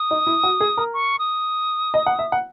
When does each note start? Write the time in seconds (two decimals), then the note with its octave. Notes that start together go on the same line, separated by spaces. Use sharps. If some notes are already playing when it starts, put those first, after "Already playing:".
Already playing: D#6
0.11 D#4
0.27 E4
0.43 F#4
0.60 G#4
0.77 A#4
0.94 C#6
1.19 D#6
1.94 D#5
2.06 F#5
2.19 E5
2.32 F#5